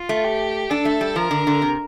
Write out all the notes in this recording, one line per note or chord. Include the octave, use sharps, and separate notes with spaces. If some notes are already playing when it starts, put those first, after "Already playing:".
Already playing: F4
A3
G4
D4 A4
A3
G3
F3 A#4
D3
D3
C3